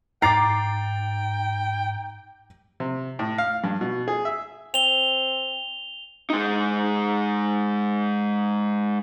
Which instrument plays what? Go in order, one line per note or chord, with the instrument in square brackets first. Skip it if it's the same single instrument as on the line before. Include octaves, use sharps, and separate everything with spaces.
[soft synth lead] G#2 [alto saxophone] G5 [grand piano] A#5 [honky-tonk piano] D6 A6 C7
[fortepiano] C3
A2
F5
G2
B2
G#4
E5
[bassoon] C4 [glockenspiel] F7 G7
[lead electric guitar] G#3 D#4